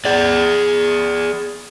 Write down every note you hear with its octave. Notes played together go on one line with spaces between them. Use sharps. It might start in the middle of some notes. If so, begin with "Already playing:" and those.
G#4 D5